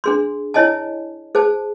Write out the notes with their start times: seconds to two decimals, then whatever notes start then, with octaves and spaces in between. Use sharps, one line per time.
0.04 D4 G#4 C6
0.54 E4 C#5 D#5 G#5 A5
1.35 G#4 C5 A5